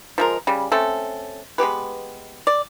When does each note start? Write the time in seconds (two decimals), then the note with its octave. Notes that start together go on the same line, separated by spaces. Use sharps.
0.18 F3 G#3 A#4
0.47 C#3 G3
0.72 A3 C4 C#4 A4
1.58 G#3 B3 G4 B4
2.47 D5